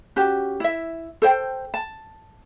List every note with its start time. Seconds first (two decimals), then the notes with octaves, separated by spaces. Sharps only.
0.16 C#4 F#4 G4
0.60 E4 E5
1.22 A4 C5 G5
1.74 A5